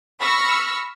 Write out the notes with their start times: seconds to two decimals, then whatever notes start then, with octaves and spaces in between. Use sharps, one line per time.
0.20 B5 C#6 E6 F6 A#6 C#7